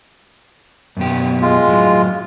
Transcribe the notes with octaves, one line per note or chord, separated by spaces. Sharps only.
F#2 B2 G4
G#3 F4
F2 A2 F#3